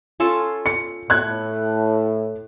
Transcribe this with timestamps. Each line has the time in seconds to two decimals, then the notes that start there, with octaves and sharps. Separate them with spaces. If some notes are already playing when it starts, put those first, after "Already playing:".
0.20 C#4 F4 A4
0.66 C#7
1.10 A2 F#6 G#6